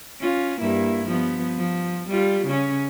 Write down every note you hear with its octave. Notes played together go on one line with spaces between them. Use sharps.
C#4 F4
G2 A#3 E4
F3 B3
F3
G3 F4
C#3 C#4